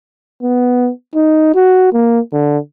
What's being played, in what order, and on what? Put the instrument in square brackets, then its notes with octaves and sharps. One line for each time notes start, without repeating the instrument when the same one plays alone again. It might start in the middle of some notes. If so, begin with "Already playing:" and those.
[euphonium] B3
D#4
F#4
A#3
D3